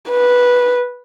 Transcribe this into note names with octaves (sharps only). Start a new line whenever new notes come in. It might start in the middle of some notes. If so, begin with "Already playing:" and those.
B4